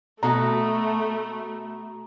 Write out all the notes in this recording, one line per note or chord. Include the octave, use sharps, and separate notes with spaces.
B2 A3 F#4 A4 A#5